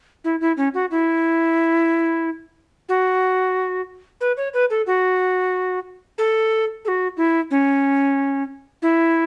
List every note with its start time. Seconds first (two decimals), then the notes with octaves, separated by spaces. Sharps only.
0.24 E4
0.41 E4
0.57 C#4
0.74 F#4
0.91 E4
2.89 F#4
4.21 B4
4.37 C#5
4.54 B4
4.70 A4
4.87 F#4
6.18 A4
6.85 A4
6.88 F#4
7.17 E4
7.51 C#4
8.82 E4